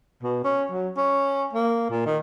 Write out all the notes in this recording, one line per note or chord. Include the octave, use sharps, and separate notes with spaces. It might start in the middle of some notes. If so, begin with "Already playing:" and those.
B2
C#4
F#3
C#4
A#3
A#2
D#3